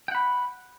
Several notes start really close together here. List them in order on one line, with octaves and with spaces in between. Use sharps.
G5 F#5 B5